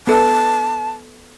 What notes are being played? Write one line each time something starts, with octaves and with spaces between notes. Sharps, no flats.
B3 A4 E5 A5